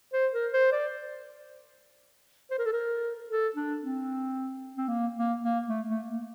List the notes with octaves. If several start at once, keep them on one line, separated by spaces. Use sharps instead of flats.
C5
A#4
C5
D5
C5
A#4
A4
A#4
A4
D4
C4
C4
A#3
A#3
A#3
A3
A3
A#3